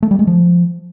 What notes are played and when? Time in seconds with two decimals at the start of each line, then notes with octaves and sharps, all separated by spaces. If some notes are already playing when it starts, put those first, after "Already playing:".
0.03 A3
0.11 G3
0.19 G#3
0.27 F3